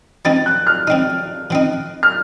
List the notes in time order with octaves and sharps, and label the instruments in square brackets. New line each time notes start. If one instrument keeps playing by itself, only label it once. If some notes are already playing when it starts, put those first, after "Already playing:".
[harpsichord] F3 C4 D#4 [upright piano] A6
[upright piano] F#6
F6
[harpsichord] F3 C4 D#4
F3 C4 D#4
[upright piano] F6